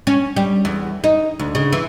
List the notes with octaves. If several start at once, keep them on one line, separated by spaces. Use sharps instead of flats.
C#4
G3
E2
D#4
D2
C#3
E3